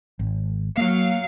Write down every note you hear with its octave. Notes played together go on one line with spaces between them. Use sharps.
G#1
F#3 A#3 F5